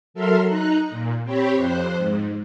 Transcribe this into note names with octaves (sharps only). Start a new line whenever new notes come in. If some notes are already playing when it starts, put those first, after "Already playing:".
F#3 A4 A#4 E5 C6 F6
D#4 A#5 F#6
A#2
C4 G4 C#5 B5
F2 C5 F#6
G#2